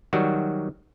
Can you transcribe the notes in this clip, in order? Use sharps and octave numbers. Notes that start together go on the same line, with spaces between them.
D#3 F#3 G3 F#4